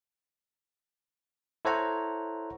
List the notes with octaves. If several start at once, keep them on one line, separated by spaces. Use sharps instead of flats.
E4 A4 C5 C#5 F#5 A#5